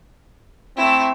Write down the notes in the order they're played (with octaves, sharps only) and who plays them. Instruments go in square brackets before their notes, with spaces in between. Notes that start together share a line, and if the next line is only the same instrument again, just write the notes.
[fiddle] A3 E4 [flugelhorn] C4